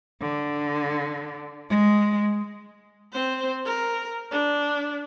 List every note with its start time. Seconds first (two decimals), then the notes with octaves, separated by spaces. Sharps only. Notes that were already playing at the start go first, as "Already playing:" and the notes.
0.21 D3
1.70 G#3
3.13 C4 C5
3.66 A#4
4.31 D4